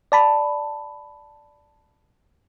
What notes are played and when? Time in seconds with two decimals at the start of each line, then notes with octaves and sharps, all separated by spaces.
0.12 D5 A5 B5